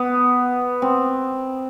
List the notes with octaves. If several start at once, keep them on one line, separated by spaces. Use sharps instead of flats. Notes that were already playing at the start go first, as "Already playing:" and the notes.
Already playing: B3
C4